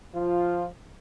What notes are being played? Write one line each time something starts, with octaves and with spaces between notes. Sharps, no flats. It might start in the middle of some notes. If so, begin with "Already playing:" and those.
F3 F4